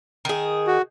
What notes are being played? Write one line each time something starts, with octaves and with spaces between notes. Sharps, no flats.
D#3 G#4
F#4